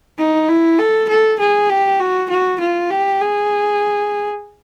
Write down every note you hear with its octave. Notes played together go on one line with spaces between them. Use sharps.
D#4
E4
A4
A4
G#4
G4
F#4
F#4
F4
G4
G#4